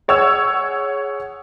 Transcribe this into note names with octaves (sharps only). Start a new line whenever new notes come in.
G#4 C#5 F#5 E6